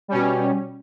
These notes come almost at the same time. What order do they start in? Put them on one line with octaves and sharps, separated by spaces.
G3 C#4 B2